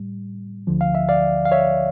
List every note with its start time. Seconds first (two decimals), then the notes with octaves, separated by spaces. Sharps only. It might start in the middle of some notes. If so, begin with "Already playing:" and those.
Already playing: A2 G3
0.67 D2 D3 F3
0.81 F5
0.95 E5
1.09 D5 F5
1.45 F5
1.52 C#5 E5